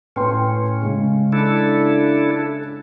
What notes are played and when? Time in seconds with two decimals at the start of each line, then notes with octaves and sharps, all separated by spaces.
0.16 A2 C#4 B4 G5 C6
0.81 C#3 G#3
1.32 D4 E4 A4